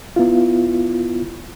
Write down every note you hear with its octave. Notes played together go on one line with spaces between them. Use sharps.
B3 E4 F4